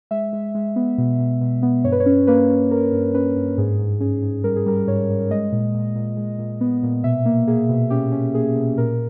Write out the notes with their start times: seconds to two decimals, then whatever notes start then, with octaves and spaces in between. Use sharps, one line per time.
0.11 G#3 E5
0.33 G#3
0.55 G#3
0.76 B3
0.98 B2
1.19 B2
1.41 B2
1.62 B3
1.84 G2 C#5
1.92 B4
2.00 C#5
2.06 C#4
2.27 A#3 B4
2.50 C#4
2.71 A#3 A#4
2.92 G2
3.14 C#4 B4
3.36 G2
3.58 G#2 G#4
3.79 G#2
4.00 C#4 G#4
4.23 G#2
4.44 G3 A#4
4.56 G#4
4.66 G3 A#4
4.87 G#2 C#5
5.10 G#2
5.31 G#3 D#5
5.52 A#2
5.74 A#2
5.96 A#2
6.17 G#3
6.39 A#2
6.61 B3
6.83 A#2
7.04 B2 E5
7.25 A#3
7.47 A#3 G#4
7.69 B2
7.90 C#4 G4
8.12 C#4
8.34 A#3 G#4
8.55 B2
8.78 A#2 A#4